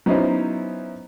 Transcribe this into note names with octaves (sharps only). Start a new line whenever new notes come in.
F#3 B3 C#4 D#4 E4 C5